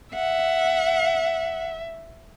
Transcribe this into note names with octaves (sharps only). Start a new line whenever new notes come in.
E5 F#5